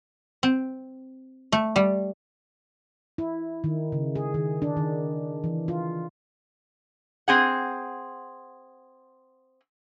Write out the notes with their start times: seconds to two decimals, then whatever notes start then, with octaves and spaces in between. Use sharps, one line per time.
0.43 C4
1.52 A3
1.76 G3
3.18 E4
3.64 D#3
3.92 C#3
4.15 G#4
4.34 D#3
4.62 D4
4.77 D#3
5.44 E3
5.68 F4
7.28 C4 G#4 F#5